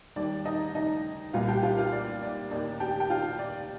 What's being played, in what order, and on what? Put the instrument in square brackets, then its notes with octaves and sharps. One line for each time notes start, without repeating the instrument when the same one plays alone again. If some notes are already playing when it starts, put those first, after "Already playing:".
[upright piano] D#2 D#3 G3 D5
D#4 D#5
D#4 D#5
C2 A#2 G3 F4 F5
G4 G5
F4 F5
F4 F5
D5
D5
D#2 D#3 A#3 D#4 D5
G4 G5
G5
F4 F5
D5